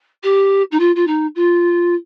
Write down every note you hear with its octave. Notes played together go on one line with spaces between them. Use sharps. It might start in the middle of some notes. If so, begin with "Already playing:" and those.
G4
D#4
F4
F4
D#4
F4